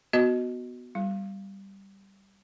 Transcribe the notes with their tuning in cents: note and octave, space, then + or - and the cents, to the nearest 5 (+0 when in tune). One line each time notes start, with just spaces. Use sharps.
B3 +0 F#4 +0 D#5 +0
G3 +0 C6 +40